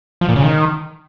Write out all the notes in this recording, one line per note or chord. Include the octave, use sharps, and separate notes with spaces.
F3
A#2
C#3
D#3